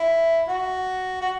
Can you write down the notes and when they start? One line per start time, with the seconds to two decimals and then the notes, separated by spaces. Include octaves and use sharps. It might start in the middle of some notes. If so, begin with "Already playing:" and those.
Already playing: E4
0.48 F#4
1.22 F#4